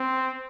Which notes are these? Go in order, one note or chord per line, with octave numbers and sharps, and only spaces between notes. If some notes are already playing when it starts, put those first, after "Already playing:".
Already playing: C4